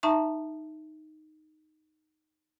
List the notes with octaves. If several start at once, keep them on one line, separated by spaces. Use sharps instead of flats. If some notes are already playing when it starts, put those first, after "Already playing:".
D#4 E5 A5 A#5 C#6